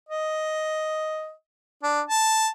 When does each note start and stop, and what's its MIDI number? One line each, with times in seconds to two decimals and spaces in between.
0.09 1.32 75
1.83 2.01 62
2.09 2.48 81